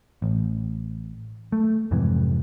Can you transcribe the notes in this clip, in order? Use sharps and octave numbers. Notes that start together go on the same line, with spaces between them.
A1
A3
F2 G#2 C3 E3